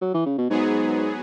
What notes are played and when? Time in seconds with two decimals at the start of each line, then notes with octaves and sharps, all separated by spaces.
0.02 F#3
0.14 E3
0.26 C#3
0.38 B2
0.50 G#2 F#3 B3 G#4